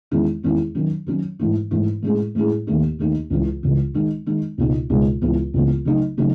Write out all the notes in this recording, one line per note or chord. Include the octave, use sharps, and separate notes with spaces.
E2 D#3 G#3 C#4 E4
E2 D#3 G#3 C#4 E4
D#3 F#3 C#4
D#3 F#3 C#4
G#2 E3 A3 E4
G#2 E3 A3 E4
A2 G#3 C#4 E4 G#4
A2 G#3 C#4 E4 G#4
D#2 D#3 A3 D#4
D#2 D#3 A3 D#4
C#2 C#3 E3
C#2 C#3 E3
D#3 G#3 D#4
D#3 G#3 D#4
C#2 B2 G#3 D#4
C#2 B2 G#3 D#4
C#2 C#3 E3 B3
C#2 C#3 E3 B3
C#3 F#3 A3 D#4
C#3 F#3 A3 D#4